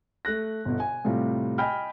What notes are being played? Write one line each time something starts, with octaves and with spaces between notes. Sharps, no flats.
A3 A4 F#6 A#6
G1 B2
G#5
A2 C3 G3 F4
D#5 G5 G#5 B5 F6